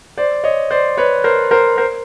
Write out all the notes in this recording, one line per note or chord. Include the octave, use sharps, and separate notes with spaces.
C5 D5
C#5 D#5
C5 D5
B4 C#5
A#4 C5
A#4 C5
A#4 C5